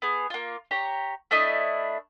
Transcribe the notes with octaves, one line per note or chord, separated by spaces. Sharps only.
B3 G#4
A#3 F4
G4 C#5 A#5
A3 D4 E4 D#5